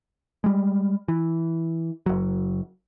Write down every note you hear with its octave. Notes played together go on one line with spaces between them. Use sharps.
G3 G#3
E3
F#1 F#3